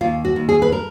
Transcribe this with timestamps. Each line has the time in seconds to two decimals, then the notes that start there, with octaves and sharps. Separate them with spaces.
0.01 D#2 F4
0.25 F#4
0.36 D#2
0.49 G#4
0.62 B4
0.72 A#4